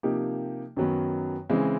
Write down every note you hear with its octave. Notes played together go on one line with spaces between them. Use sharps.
C3 F3 A#3 D#4 G4
F#2 D#3 F#3 B3
C#3 E3 G#3 C4